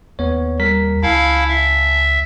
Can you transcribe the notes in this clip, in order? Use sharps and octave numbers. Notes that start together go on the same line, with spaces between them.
D#2 B3 C#5
G3 A#4 B6
C#2 E4 F5 G#5 A5
E5